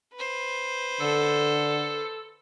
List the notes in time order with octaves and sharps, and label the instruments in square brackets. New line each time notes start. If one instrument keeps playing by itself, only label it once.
[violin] B4 C5
[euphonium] D3 [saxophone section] A4